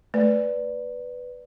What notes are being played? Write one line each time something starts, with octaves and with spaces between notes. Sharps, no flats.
A3 B4 D5